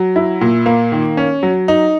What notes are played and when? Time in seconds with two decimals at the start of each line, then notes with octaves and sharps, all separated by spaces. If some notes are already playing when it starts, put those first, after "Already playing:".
Already playing: F#3
0.16 E4
0.41 A#2
0.66 A#3
0.92 D#3
1.17 C#4
1.43 F#3
1.68 D#4